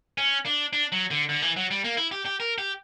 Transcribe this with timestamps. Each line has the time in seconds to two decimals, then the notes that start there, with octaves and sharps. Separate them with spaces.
0.18 C#4
0.46 D4
0.73 D4
0.92 F#3
1.11 D3
1.29 D3
1.42 E3
1.57 F#3
1.71 G3
1.84 A#3
1.97 E4
2.12 G4
2.26 G4
2.40 A#4
2.58 G4